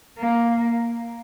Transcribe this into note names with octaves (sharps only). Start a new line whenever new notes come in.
A#3